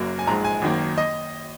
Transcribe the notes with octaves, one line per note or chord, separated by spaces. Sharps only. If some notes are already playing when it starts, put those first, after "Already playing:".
Already playing: F#1 F#2 F#3 A#3
G#5
A#1 G#2 G#3 A#5
G#5
G#1 F#2 D#3 A#3
D#5